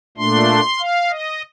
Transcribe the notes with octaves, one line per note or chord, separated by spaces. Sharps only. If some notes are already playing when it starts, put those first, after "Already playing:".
A#2 A3 D4 C6
F5
D#5